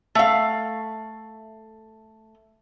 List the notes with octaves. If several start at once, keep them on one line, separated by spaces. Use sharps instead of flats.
A3 F5